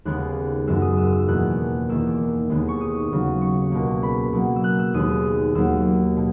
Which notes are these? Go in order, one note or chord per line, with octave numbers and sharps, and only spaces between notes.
D#2 C#3 G#3 B3 F#6
F#2 D#3 G#3 B3 E6
D#6
E6
E6
E2 B2 A#3 F#6
E2 D#3 A#3 E6
D#2 D#3 G#3 B3
C#6
D#6
D#2 C#3 F#3
C#6
C#2 B2 A#3
B5
B2 F#3 A#3
E6
F#6
E6
D#2 D#3 G#3 B3 D#6
D#2 D#3 F#3 A#3 E6
B2